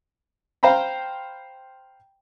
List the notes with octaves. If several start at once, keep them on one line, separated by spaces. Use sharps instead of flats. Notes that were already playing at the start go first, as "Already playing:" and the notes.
C5 F5 G5 A#5 B5